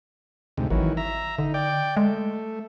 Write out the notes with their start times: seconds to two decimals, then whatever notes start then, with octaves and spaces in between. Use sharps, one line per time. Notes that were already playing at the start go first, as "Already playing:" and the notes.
0.57 D2 G#2 C3
0.70 G#1 D#3 E3 F#3
0.97 E5 A#5
1.38 D3 D#4
1.54 D5 G5
1.97 G#3 A3